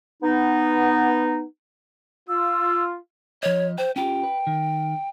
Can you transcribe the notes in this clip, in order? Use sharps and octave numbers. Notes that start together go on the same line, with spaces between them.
B3 D#4
F4 E6
F3 C#5 D#5
C5 G5
C#4 F4 G4 G5
B4
D#3